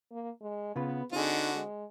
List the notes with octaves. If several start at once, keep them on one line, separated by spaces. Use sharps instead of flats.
A#3
G#3
C#3 B3 F4 B4
D3 C4 D#4 F#4 G#4
G#3